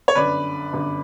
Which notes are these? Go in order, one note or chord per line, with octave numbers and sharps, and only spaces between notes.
C#5
G1 F#2 D3 B4 D5
G1 F#2 D3